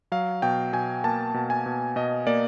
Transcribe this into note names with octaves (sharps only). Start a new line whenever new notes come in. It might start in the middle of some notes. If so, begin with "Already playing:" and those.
F#3 F5
B2 G5
B2 G#5
A#3 A5
B2
G#5
B2
B2 D#5
A#3 D5